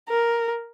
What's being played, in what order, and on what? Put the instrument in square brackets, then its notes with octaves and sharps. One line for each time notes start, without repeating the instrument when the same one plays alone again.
[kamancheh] A#4